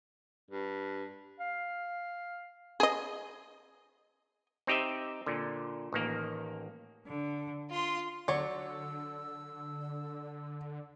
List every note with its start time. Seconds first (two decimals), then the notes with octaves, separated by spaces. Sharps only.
0.51 G2
1.40 F5
2.80 G#4 D#5
4.67 C4 D#4 G4 D#5 E5
5.26 A#2 D3
5.93 A1 D#3 A#3
7.06 D3
7.70 F4 C6
8.28 D3 F#3 C#5 D5 E6